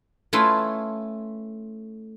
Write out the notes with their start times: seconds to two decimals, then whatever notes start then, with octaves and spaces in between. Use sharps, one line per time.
0.33 A3 C#4 E4 F4 B4 C6